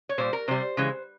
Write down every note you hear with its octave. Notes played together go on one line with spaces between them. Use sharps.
C#5
A#2 G3 C5
A#4
C3 G3 C5
C#3 E3 G#3